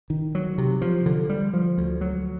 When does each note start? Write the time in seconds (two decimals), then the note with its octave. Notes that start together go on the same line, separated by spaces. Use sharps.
0.10 D#3
0.35 F#3
0.58 C3
0.81 F3
1.06 D3
1.29 G3
1.53 F3
1.78 D2
2.01 F#3